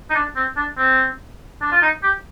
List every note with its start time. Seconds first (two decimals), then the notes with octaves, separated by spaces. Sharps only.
0.10 D#4
0.15 D4
0.36 C4
0.57 D4
0.77 C4
1.62 D4
1.72 F4
1.82 D#4
2.03 G4